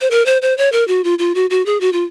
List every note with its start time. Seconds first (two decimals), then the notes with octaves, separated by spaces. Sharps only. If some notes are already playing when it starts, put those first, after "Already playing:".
0.01 C5
0.11 A#4
0.26 C5
0.42 C5
0.58 C#5
0.72 A#4
0.88 F#4
1.04 F4
1.19 F4
1.35 F#4
1.50 F#4
1.66 G#4
1.81 F#4
1.93 F4